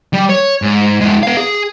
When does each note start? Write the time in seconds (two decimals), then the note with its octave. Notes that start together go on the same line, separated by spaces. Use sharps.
0.13 G3
0.29 C#5
0.62 G#2
1.01 G#3 E4
1.23 B3 F5
1.37 G#4